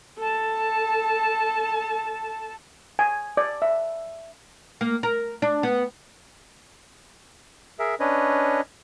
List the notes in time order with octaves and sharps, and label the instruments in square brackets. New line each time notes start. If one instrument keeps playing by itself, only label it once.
[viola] A4 A5
[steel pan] G#5
D5
E5
[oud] A#3
A#4
D4
B3
[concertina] G#4 A#4 E5
C#4 D4 B4 C#5 D#5